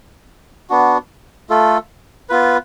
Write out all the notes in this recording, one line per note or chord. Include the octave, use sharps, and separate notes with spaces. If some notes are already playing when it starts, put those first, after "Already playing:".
B3 D4 F#4
A3 F4 A4
B3 F4 B4